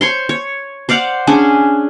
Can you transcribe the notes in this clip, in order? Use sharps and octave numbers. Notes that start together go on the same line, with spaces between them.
C5 C#5 C6
C#5
C5 D5 F5 F#5
C#4 D4 G#4